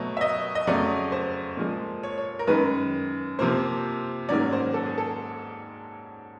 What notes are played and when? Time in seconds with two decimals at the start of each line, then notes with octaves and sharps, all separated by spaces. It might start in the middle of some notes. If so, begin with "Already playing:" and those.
Already playing: B2 F#3 A3
0.17 E5
0.21 D#5
0.55 D#5
0.67 F2 C#3 F#3 A3 D5
1.12 C5
1.57 A#2 F3 G#3
2.03 C#5
2.18 C#5
2.39 A#4
2.48 F#2 D#3 G#3 B4
3.39 C3 F3 A#3 C5
4.29 G#2 D#3 F#3 A#3 C#4 D5
4.52 C5
4.74 A4
4.86 G#4
4.98 A4